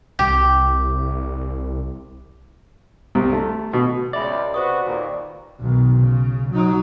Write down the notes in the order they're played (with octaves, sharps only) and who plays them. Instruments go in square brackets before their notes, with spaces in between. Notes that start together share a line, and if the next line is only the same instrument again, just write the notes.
[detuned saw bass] C2 [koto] G4
[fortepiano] C2
A3
B2
[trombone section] C#2 [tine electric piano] D5 [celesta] E5 B5
[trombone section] C3 F#4 B4 [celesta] C5 C#6 D#6
[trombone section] D#2 A#2
[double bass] B1 D#3
C#3
F#3 D#4